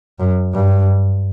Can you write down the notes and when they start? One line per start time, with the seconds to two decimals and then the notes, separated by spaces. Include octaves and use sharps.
0.19 F#2
0.54 G2